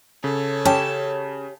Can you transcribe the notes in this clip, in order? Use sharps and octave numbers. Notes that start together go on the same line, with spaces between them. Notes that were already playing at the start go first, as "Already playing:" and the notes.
C#3 A4 C#5
C#4 G4 A5